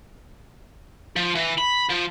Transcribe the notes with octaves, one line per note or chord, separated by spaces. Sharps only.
F3
E3
B5
F3